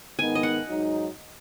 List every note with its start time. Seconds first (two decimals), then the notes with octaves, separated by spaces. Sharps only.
0.18 G#2 D#3 B3 D#4 G#5
0.35 D#5
0.43 F#5
0.68 G#2 F#3 D#4